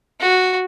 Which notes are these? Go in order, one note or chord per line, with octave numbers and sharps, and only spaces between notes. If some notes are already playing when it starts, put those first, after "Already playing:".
F#4